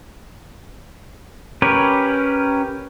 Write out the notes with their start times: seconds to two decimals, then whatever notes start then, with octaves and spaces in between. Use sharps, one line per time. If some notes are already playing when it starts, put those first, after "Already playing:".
1.62 C#4 G4 A#4 B4 C#5